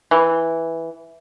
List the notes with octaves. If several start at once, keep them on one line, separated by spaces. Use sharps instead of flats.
E3